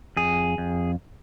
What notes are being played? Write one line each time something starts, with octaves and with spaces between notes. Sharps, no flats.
F2 G#4
F2